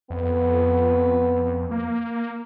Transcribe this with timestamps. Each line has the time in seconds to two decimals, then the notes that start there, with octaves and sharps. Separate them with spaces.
0.10 F2 B3
1.71 A#3